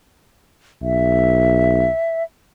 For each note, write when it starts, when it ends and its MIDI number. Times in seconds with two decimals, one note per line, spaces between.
0.82 1.88 35
0.82 2.23 76